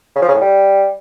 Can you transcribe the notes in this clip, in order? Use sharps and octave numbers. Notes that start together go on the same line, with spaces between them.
C#3
F3
C#3
A2
G3